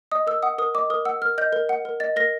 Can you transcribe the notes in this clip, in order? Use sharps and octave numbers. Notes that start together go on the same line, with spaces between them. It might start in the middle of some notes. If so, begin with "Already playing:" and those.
D#5 D#6
A#4 E6
F#5 D#6
A#4 D#6
D#5 D6
A#4 D#6
F#5 E6
A#4 F6
D#5 G6
A#4
F#5
A#4
D#5 A6
A#4 A#6